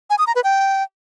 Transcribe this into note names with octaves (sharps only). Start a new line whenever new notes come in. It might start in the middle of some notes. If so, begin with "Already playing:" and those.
G#5
D#6
A#5
B4
G5